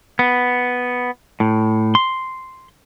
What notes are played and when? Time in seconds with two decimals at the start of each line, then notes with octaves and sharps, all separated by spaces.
0.19 B3
1.40 A2
1.95 C6